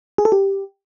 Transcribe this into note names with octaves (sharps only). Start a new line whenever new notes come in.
G#4
A4
G4